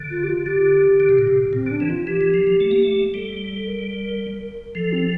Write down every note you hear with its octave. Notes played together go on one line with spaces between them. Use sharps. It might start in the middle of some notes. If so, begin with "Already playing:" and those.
Already playing: D3
F4
G4
F4
D3 G4
D3
C3
A#2
C3
A#2 C4
D3
D4
E3
F4
E3 G4
E3
F3
F3
A3
A#3
A3
G3 A4
A4
A#4
F3 A4
C4